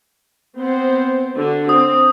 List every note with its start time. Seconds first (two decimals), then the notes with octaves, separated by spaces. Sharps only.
0.58 B3 C4 C5
1.37 D3 F#4
1.69 C4 D#6